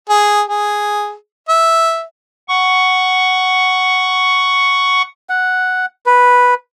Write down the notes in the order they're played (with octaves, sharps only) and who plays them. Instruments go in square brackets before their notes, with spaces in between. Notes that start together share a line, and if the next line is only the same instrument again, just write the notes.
[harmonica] G#4
G#4
E5
[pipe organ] F#5 C#6
[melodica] F#5
B4